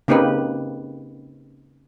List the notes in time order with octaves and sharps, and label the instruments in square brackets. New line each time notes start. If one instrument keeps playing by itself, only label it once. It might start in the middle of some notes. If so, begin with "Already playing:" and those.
[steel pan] C#3 A#3 C4 D#4 G4 B4